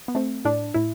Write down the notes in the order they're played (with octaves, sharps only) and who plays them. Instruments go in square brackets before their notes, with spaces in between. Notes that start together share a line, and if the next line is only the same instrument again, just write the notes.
[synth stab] B3
A3 C4
A2 D4
A2 E4